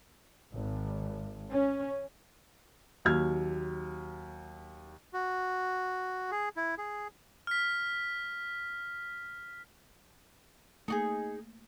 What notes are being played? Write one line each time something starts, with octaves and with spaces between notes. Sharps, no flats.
G#1
C#4
D#2 F#3 E6 F6 G#6
F#4
G#4
E4
G#4
F6 B6
A3 A#3 D#4 F#4 G#4